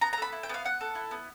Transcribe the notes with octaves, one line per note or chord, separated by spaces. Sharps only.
B3 A#5
A#5
A4 B5
E4
G5
B3 F5
B3 F#5
A4
E4
B3